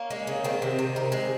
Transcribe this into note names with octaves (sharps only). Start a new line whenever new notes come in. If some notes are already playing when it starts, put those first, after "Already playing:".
Already playing: A#3 C#4
G#3
C#3
D#3 C4
C3
C3
D#3
G#3